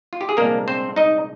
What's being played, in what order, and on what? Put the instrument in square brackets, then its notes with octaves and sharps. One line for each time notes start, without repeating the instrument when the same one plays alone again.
[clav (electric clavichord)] F4
G4
G#4
C2 A#2 F3 G#3 A#3 D4 A#4
C4 C5
D#4 D#5